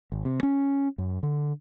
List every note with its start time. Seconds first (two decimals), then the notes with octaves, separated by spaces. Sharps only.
0.12 G#1
0.25 C3
0.43 C#4
0.98 F#2
1.23 D3